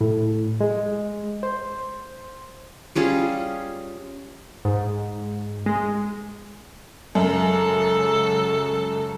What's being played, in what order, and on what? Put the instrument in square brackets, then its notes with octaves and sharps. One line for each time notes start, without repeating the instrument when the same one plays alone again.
[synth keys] A2
G#3
C5
[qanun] G3 C#4 F4 G#4
[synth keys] G#2
G#3
[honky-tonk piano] F#2 [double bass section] C#3 F#3 G#3 [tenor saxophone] A4